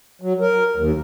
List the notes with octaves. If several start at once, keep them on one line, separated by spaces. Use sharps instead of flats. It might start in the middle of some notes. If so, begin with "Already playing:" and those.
F#3
A#4
D#2